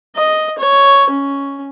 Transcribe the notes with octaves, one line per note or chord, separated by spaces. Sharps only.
D#5
C#5
C#4